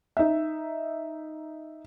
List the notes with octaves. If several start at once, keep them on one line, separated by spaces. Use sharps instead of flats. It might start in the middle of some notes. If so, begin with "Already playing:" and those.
D#4 E5